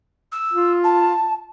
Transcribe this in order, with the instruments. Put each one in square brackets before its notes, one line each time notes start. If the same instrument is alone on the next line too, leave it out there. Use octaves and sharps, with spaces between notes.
[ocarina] E6
[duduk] F4
[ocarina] A5